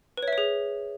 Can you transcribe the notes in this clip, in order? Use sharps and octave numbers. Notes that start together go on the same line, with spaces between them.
B4
C#5
E5
C#5
G#4